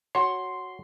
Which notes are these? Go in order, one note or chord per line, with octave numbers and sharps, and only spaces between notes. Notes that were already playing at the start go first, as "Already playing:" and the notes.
F#4 C#5 C6